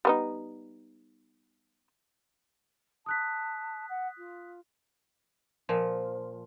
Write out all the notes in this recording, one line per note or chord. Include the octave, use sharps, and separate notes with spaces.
G3 B3 D#4
A5 D#6 F#6 B6
F#5
F4
A#2 F3